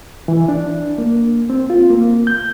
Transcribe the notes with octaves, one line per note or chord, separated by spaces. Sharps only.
E3
D4
A#3
C4
F4
A#3
G6